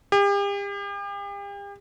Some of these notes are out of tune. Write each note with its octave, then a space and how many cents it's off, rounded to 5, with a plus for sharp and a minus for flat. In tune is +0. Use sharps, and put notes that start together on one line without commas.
G4 +40